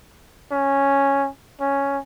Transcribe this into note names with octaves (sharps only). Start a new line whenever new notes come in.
C#4
C#4